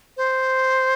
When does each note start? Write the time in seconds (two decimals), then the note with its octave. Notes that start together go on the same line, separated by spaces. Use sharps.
0.17 C5